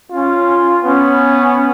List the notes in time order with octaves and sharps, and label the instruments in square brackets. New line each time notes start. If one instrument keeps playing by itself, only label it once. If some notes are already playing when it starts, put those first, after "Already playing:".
[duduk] C#4 [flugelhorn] F4
[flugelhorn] B3 [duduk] C#4